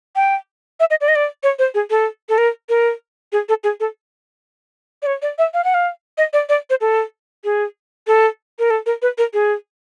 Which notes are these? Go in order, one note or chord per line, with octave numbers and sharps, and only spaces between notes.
G5
E5
D#5
D5
D#5
D5
C#5
C5
G#4
A4
A4
A#4
A#4
G#4
A4
G#4
A4
D5
C#5
D5
E5
F5
F#5
F5
D#5
D5
D5
C5
A4
G#4
A4
A#4
A4
A#4
B4
A#4
G#4